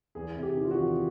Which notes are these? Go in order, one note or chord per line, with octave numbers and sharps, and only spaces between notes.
E2 G#4
C3
G4
D#3
F4
F#4
E2